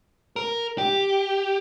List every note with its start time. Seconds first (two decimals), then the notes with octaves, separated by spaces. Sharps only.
0.36 A#4
0.78 G4